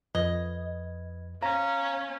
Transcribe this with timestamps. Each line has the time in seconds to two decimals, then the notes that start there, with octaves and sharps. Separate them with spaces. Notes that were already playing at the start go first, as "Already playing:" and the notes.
0.15 F2 B4 D#5 G#6
1.43 C#4 F5 A#5